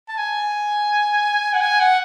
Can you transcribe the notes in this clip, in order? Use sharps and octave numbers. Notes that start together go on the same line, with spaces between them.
A5
G#5
F#5
G#5
F#5